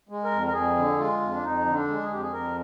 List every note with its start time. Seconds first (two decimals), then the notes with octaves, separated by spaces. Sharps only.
0.09 G#3
0.24 A#4
0.32 F2
0.47 A#4
0.53 F2 G#4
0.76 D3
0.98 G#3 F4
1.21 F2
1.33 D4
1.42 F2 D#4
1.65 D3
1.73 D4
1.88 G#3
2.02 G#4
2.10 F2 G4
2.21 G#4
2.33 F2 A#4